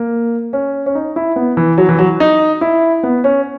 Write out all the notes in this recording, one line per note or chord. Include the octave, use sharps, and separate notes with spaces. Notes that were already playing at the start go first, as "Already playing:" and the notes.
Already playing: A#3
C#4
C#4
D#4
E4
B3
E3
F#3
E3
F#3
D#4
E4
B3
C#4